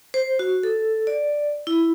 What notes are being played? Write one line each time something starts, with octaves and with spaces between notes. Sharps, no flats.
C5
F#4
A4
D5
E4